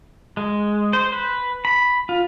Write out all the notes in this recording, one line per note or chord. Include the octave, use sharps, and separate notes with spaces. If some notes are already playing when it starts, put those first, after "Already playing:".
G#3
C5
B4
B5
F4